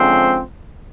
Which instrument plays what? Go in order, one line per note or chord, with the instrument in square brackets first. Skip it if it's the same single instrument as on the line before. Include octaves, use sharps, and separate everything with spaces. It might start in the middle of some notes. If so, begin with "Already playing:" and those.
Already playing: [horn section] D3 F3 G#3 C4 C#4 C5